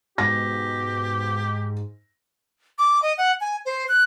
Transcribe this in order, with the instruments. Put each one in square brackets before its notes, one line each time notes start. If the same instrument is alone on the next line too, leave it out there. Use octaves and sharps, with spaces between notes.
[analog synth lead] G#2 [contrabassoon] B2 [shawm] G4 [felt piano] A#6
[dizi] D6
D#5
F#5
G#5
C5
F#6